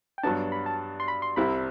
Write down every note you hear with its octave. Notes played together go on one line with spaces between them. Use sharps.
G5
G2 F#3 B3 D4 A5
B5
A5
C6
B5
C6
C2 C3 G3 C4 E4 B5